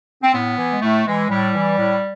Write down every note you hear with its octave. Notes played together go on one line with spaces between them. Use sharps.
C4
A2 B3
E3
G#3
A2 A3
E3 G#3
A2 G3
E3
A2